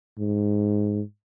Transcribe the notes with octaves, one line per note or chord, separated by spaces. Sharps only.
G#2